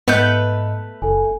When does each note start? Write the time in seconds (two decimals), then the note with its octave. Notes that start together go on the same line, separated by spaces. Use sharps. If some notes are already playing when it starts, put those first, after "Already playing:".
0.08 G#2 A3 B3 B4 D#5 G6
1.02 F#1 A4 G#5